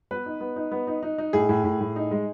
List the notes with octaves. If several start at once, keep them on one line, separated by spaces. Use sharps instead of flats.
B3 B4
D#4
B3
D#4
B3
D#4
D#4
D#4
A2 G#4
A2
A2
A2
D#4
G#3